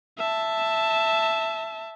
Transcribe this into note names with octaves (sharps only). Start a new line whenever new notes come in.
E5 A5